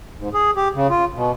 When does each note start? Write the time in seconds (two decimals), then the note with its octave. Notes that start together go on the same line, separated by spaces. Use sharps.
0.17 G#2
0.34 G#4
0.56 G4
0.74 C#3
0.90 F4
1.14 B2